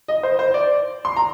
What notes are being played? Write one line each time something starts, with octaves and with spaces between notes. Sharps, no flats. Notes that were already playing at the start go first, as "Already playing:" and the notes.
D#5
C5
C5
D5
C6
A#5